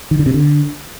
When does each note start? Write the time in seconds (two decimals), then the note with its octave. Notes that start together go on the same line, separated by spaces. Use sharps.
0.11 D#3
0.19 D3
0.26 C3
0.34 D3